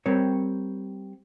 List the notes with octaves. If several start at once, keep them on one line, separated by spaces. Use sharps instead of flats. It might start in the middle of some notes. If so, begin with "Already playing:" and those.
G3 C4 A#4 C#5